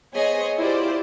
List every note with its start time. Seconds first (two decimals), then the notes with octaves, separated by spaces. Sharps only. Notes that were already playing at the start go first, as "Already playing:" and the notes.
0.15 B3 G#4 C5 C#5 D#5 G#5
0.57 E4 F4 G4 C5 D5